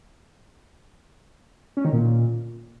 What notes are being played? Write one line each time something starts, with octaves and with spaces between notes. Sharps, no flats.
C#4
D#3
A#2